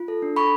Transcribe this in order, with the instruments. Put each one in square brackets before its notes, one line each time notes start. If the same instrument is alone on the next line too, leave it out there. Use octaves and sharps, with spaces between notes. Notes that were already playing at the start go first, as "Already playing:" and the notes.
Already playing: [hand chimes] F4
A4
D4
A4 B5 C#6